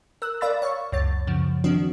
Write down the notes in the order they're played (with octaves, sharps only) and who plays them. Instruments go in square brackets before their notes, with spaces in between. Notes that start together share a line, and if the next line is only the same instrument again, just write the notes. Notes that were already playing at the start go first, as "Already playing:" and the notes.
[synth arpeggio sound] A#4 E6 F#6
A#4 D5 F5 B5 E6 A6
C#5 F5 C#6
C#2 F#2 C#5 A6
F#2 C#3 F3
D#3 F3 C4 D4 F#4